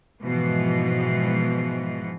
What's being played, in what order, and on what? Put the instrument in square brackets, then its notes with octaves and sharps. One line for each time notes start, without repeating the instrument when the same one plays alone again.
[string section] G#2 B2 E3 F3